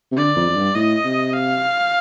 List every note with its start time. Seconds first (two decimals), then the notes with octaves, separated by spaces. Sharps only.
0.12 C3
0.17 D3 D5
0.36 F2
0.50 F2
0.56 G2
0.75 A2 D#5
1.05 C3
1.33 F5